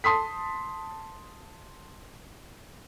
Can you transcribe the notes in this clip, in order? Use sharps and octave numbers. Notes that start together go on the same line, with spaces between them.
A5 C6 D#6 B6